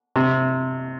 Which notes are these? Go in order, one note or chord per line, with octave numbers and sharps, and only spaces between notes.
C3